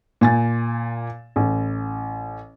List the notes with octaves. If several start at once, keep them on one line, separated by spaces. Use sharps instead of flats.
A#2 G#5 A6
A1